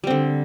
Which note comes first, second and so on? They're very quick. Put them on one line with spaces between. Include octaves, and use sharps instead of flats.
G3 C4 D3